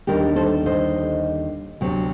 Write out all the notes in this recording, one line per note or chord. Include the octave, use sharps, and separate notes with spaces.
D#2 D3 G3 G4 A#4
A4 C5
C5 D#5
D2 C3 F#3